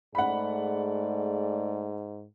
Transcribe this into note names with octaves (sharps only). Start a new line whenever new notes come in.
G#2 A3 G#4 D5 F#5 B5